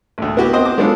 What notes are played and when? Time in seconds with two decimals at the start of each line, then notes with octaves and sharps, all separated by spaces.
0.18 A1 D2
0.37 B3 E4 F#4 G4
0.53 C4 C5 D#5
0.65 D6
0.78 G#3 B3 C#4 D4 F4 A4